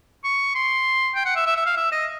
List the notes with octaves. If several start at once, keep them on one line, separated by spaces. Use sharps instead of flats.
C#6
C6
G5
F#5
E5
E5
E5
F5
E5
D#5